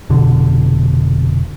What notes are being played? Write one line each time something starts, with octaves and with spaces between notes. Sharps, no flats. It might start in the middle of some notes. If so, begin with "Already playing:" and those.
F1 B2 D3